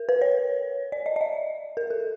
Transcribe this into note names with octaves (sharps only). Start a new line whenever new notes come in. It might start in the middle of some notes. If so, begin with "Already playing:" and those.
Already playing: A#4
B4
C#5
D5
D#5
D#5
E5
A#4
A4